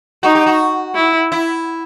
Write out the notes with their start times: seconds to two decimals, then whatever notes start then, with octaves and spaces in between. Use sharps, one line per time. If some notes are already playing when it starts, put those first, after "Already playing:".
0.23 D#4 F#4
0.35 G4
0.46 F#4
0.95 E4
1.32 E4